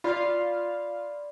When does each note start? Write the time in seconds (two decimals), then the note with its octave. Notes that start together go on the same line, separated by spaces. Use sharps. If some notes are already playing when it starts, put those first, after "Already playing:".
0.04 F4 D5 F5 B5